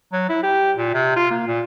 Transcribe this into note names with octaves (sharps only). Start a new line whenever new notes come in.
F#3
E4
G4
A#2
C3
F4
A#3
A#2